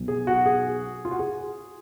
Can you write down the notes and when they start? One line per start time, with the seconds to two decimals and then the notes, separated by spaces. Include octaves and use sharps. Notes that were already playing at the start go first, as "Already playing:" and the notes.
Already playing: B1 B2 F#3
0.08 G#4
0.27 F#4
0.46 G#4
1.05 F4
1.11 F#4
1.19 G#4